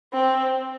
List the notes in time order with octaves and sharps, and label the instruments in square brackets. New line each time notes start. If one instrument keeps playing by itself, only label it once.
[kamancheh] C4